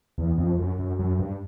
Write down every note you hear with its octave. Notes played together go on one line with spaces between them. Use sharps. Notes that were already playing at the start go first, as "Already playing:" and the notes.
E2
F2
F#2
F#2
F#2
G2